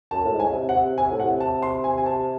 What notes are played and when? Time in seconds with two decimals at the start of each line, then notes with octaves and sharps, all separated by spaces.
0.11 F#2 A5
0.25 A2
0.33 G#2
0.40 G#5
0.48 C#3
0.54 C3
0.69 F#5
0.76 C3
0.98 C3 G#5
1.11 A2
1.20 F#5
1.24 C3
1.40 A5
1.62 C6
1.84 G#5
1.98 G#5
2.06 A5